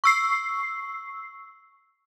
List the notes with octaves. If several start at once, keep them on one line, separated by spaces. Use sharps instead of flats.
C#6 E6 C7